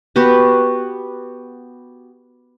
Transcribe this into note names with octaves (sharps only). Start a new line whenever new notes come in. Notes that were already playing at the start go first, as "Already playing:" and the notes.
B3 F#4 G4